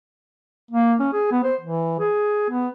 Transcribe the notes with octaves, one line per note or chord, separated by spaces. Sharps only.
A#3
C#4
G#4
B3
C5
E3
G#4
B3